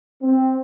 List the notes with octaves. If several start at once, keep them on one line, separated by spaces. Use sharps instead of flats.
C4